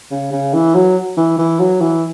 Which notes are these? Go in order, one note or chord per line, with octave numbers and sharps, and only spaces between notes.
C#3
C#3
E3
F#3
E3
E3
F#3
E3